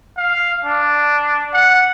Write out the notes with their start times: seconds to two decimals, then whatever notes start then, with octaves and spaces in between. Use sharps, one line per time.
0.17 F5
0.65 D4
1.54 F#5